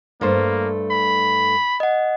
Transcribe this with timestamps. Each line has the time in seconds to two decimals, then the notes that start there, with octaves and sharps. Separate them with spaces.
0.21 G2 A3 A#3 C5
0.91 B5
1.80 D#5 F#5